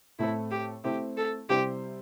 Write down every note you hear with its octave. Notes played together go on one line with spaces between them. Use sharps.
A2 A3 C4 E4 A4
G4
A3 C4 E4 G4
A4
C3 G3 E4 G4 C5